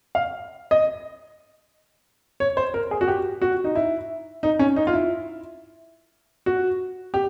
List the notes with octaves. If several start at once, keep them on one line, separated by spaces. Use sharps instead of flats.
F5
D#5
C#5
C5
A#4
G#4
F#4
G4
F#4
D#4
E4
D#4
C#4
D#4
F4
E4
F#4
G4